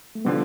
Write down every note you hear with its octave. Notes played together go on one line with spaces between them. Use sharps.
A3
D3 F3 G3 B3